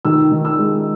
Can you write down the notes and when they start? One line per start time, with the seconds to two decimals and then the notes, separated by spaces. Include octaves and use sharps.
0.05 D#3 E6
0.32 D#3
0.45 E6
0.58 G#3